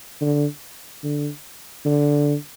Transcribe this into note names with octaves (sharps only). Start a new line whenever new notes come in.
D3
D3
D3